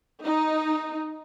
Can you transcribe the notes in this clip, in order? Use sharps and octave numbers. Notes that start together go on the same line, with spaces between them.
D#4